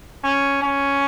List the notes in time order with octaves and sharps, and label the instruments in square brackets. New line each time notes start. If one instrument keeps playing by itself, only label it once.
[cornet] C#4
C#4